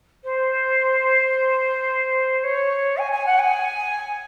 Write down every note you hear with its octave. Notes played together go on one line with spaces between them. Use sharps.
C5
C#5
G#5
G#5
F#5
G#5